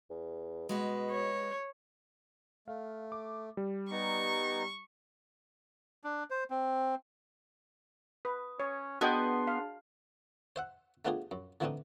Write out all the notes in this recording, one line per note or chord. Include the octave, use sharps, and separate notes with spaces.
E2
B2 G#3 F#4 B4
C#5
A3 F5
D6
G3
B3 D#4 A#5 C#6
D4
C5
C4
B4 D#6
C#4 C#5
B3 D4 F#4 G#4 D#5 G5 A5 C6
F5
C5 E5 F#5
A3 B3 D4 F4 G4 G#4
F#2
D3 E3 A3 C4 D4 D#4